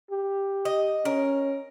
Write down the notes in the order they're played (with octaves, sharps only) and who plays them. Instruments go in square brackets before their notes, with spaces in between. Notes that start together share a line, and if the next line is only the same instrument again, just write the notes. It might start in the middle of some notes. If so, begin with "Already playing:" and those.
[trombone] G4
[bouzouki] D#5
[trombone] C#4 [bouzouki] A#4